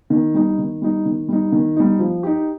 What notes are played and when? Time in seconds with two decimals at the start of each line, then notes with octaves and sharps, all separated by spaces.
0.10 D#3
0.34 G3 D#4
0.58 D#3
0.82 G3 D#4
1.06 D#3
1.28 G3 D#4
1.52 D#3
1.76 G3 D#4
1.99 F3
2.23 D#4 G4